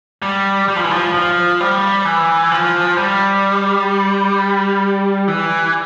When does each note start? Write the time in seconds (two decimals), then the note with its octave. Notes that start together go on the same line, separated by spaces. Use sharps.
0.22 G3
0.68 G3
0.76 F3
0.84 E3
0.91 F3
1.14 F3
1.60 G3
2.05 E3
2.51 F3
2.98 G3
5.28 E3